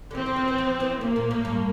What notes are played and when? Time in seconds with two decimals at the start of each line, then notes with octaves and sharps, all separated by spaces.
0.11 D3
0.15 E3 C4
0.26 D3
0.36 F3
0.48 E3
0.58 F3
0.80 E3
1.01 C3 A#3
1.16 A#2
1.31 A2
1.45 G2